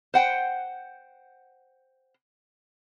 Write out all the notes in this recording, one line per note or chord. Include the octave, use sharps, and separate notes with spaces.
C5 F#5 G5